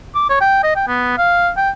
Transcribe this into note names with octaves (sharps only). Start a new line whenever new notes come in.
D6
C#5
G5
D#5
G5
B3
F5
G5